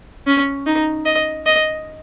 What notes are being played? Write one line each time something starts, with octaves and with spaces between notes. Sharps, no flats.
C#4
D#4
D#5
D#5